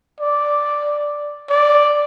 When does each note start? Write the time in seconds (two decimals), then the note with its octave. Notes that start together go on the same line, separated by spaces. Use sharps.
0.20 D5
1.50 D5